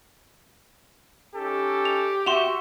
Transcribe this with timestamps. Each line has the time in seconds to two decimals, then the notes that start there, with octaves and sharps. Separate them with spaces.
1.34 C#4 D#4 G4 A4
1.85 F7
2.26 F#4 E5 C6 E7 F7